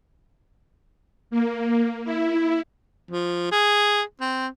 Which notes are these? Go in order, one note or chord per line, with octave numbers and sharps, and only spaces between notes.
A#3
E4
F3
G#4
C4